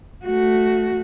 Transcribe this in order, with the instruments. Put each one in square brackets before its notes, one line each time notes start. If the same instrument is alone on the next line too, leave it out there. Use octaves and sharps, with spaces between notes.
[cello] A3 F#4